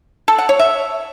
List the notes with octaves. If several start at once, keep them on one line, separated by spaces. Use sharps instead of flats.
A4
F#5
C#5
E5